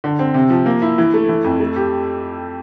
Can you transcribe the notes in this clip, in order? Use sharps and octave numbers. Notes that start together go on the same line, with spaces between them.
D3
C4
C3
F3
A#3
E4
E3
A3
E3
F2
A3
G4